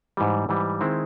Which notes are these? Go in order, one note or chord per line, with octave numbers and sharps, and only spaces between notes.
G#2 E3 G3
G#2 E3 G3
D#3 G#3 C4 E4